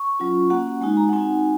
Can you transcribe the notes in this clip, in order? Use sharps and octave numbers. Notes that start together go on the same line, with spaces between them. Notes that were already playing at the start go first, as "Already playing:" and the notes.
Already playing: C#6
F#3 C#4 F4
A#3 C#4 F#4 F#5
G#3 D#4 F#4 G#5
A#5
F#5
C4 D#4 F#4 G#5